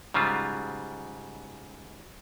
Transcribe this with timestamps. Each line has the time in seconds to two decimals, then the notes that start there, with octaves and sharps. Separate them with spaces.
0.14 G#2 C#3 F#3 G3 F4